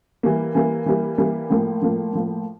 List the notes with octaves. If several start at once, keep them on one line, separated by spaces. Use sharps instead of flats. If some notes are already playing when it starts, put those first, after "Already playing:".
E3 G3 A#3
E3 G3 A#3
E3 G3 A#3
E3 G3 A#3
A2 F3 A#3
A2 F3 A#3
A2 F3 A#3